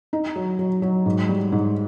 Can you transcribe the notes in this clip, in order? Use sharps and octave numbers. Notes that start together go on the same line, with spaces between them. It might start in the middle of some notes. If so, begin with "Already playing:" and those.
D#4
F#3
F#3
F#3
G#2
G3
G#2